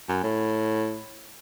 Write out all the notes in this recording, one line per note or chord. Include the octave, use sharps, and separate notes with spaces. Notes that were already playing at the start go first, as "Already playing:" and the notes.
F#2
A2